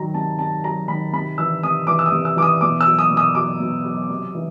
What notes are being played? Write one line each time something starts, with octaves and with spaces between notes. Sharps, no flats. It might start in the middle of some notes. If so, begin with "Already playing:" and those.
Already playing: D#3 F#3 A#5
C3 A5
C3 A5
F#3 A#5
D#3 B5
C3 B5
E3 E6
C3 D#6
E3 D6
E6
D#6
C3
E6
E3 D6
D#6
B2 D6
E6
F#3
D#6
B2
D#6
F#3 D6
B2
F#3
C3
E3